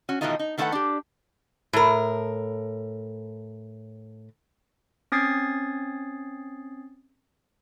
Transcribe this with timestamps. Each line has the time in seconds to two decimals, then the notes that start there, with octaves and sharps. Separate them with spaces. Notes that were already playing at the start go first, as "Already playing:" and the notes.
0.09 C#4 F#4
0.21 B2 D#3 E3 A3 D#4 F4
0.39 D#4
0.58 D#3 A3 E4 A4 B4 F#5
0.72 D4 G4
1.73 A2 A#4
5.12 C4 C#4 D#6 G#6 A6 C7